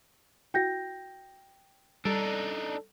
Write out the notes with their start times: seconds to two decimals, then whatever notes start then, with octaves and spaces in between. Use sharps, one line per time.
0.54 E4 F#4 G5 G6 A#6
2.05 G3 D4 D#4 A4 A6 D7